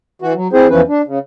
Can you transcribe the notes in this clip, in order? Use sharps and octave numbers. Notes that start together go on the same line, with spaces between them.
E3 F#4
F#3
C4 E4 G#4 C5
E2 E3 F3 C#4 B4
D4
C#3